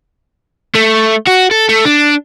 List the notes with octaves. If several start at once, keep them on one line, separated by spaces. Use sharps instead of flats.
A3
F#4
A4
A3
D4